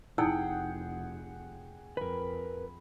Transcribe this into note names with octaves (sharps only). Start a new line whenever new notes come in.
F1 D#4 E4 G#4 F#5 G5 E6
F2 A#4 B4 B5